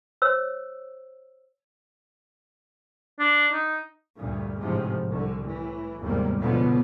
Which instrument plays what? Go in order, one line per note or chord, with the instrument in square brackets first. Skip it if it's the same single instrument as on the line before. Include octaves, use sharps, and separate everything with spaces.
[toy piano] C5 C#5 E6
[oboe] D4
D#4
[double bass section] D2 G2 A#2
A1 G#2 C3 F3
C2 D3
A2 E3
G1 D#2 G#2 C3 G3 A#3
C#2 B2 D3 F3 B3